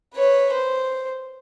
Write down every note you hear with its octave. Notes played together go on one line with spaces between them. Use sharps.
B4 C#5
C5